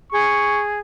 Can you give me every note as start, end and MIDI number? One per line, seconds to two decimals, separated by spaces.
0.12 0.79 68
0.12 0.63 85